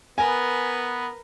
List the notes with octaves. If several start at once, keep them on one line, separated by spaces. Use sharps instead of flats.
B3 A#4 B4 G#5